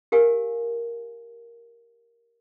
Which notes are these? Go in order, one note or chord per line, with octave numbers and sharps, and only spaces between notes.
G4 A#4 F5 G#5